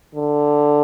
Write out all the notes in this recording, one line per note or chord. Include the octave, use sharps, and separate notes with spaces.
D3